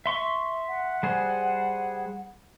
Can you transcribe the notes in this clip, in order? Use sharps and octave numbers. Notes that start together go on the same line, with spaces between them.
E5 C6 C#6
F#5
G3 G#4 C5